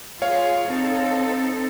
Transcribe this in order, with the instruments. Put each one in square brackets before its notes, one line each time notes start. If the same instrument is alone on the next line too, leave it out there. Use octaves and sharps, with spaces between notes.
[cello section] F4 G#4 [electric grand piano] C#5 F5
[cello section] C4 D#4 A4